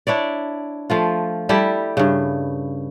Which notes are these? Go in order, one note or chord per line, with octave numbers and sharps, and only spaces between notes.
D4 E4 C#5 D5
F3 A3 F4
G3 E4 G4 A4
G2 C#3